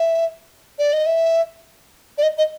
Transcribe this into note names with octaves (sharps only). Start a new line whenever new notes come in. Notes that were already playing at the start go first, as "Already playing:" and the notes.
Already playing: E5
D5
D#5
E5
D5
D#5
D#5